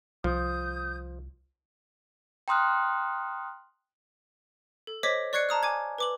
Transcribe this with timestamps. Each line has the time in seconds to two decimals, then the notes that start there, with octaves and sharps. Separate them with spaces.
0.24 C2 F3 D#6 G6
2.48 G5 A#5 C6 D#6 F6 F#6
4.87 A4
5.03 C5 C#5 D#5 D6 G#6 B6
5.33 D5 C#6 F#6 G#6 C7 C#7
5.49 A5 A#5 D#6 F6
5.63 G#5 D6 G#6
5.98 B4 D6 F#7